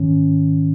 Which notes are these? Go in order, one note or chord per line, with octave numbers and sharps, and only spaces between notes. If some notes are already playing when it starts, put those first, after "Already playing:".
Already playing: G#2 D#3 C#4